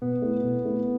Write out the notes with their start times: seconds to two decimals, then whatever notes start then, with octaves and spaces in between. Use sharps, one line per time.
0.02 B2 B3
0.22 A3 E4
0.43 B2
0.65 A3 E4